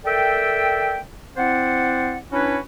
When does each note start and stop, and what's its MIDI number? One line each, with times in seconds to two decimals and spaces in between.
0.05 1.00 69
0.05 1.00 70
0.05 1.00 74
0.05 1.00 76
0.05 1.00 79
1.37 2.17 60
1.37 2.17 64
1.37 2.17 72
1.37 2.17 74
1.37 2.17 78
2.32 2.58 61
2.32 2.58 62
2.32 2.58 64
2.32 2.58 66
2.32 2.58 71
2.32 2.58 73